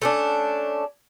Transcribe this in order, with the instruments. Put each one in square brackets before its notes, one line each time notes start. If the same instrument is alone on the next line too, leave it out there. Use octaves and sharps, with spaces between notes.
[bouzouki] A3 C#4 D4